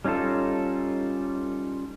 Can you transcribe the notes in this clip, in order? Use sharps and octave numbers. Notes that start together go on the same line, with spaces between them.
G3 C#4 D#4 F4 A4